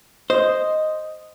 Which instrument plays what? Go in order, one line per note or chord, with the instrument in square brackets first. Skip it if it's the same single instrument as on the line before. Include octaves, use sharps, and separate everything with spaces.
[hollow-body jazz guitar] C5 [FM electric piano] D#5